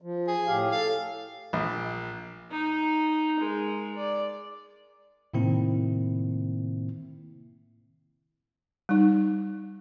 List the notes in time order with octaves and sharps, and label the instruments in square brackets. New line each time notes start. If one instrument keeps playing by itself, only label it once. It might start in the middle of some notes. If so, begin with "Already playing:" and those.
[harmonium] F3
[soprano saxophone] G#4
[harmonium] A2 G4 F5
[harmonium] A4 [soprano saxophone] F5
[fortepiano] A#1
[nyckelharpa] D#4
G#3 A#4
D5
[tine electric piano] A2 C3 D#3 A#3 C4 E4
[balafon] G3 D#4